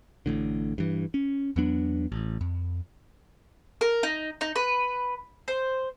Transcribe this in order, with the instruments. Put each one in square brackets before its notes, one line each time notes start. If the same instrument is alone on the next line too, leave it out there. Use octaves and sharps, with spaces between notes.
[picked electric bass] A1 A2 D3
G2 E3
C#4
E2 F#3 B3 D4
A1
F2
[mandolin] A#4
D#4
D#4
B4
C5